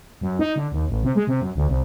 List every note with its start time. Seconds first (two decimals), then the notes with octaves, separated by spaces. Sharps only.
0.21 F#2
0.39 D#4
0.56 D3
0.72 D#2
0.89 A1
1.04 C3
1.15 G#3
1.27 C3
1.41 F#2
1.56 D2
1.68 C2